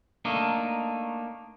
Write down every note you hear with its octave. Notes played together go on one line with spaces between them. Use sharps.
A3 A#3 D4 D#4